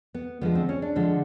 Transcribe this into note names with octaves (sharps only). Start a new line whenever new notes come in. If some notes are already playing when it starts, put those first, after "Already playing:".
B3
D3 F3 G#3 B3
C4
C#4
D4
D3 F3 G#3